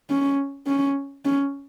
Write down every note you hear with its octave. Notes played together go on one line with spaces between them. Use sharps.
C#4
C#4
C#4